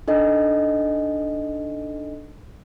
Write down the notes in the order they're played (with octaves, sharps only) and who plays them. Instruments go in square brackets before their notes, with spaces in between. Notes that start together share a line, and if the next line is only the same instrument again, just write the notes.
[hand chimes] D4 D#4 A4 D#5